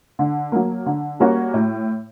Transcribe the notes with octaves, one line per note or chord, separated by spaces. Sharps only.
D3
F#3 A#3
D3
G3 A#3 C#4 F#4
A2